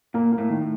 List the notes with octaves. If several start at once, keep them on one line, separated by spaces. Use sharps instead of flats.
A#2 A#3
A#3
A2
D#3
A2